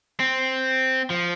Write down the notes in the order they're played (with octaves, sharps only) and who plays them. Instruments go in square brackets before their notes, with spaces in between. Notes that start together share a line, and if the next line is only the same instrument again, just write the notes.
[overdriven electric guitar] C4
F3